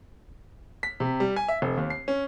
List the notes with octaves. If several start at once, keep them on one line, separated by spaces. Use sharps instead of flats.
B6
C3
G3
G#5
E5
F1
D#2
C7
C#4